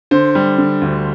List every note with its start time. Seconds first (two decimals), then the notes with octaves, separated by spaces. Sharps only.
0.11 D3 C5
0.35 G3
0.58 D3
0.81 D2